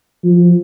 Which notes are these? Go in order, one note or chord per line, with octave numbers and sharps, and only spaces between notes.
F3